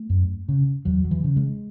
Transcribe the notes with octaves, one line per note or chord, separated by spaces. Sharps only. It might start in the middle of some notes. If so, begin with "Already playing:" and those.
Already playing: A3
F#2
C#3
E2 F#3
F#3
E3
C#3
G#3